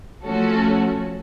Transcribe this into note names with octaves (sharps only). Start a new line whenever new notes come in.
F3 A3 C#4 F#4 A4